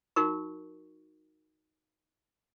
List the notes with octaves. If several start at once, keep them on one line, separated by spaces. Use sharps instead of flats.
D#4 F#4 A#4 C#6